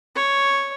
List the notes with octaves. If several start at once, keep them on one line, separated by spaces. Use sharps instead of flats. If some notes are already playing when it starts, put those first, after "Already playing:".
C#5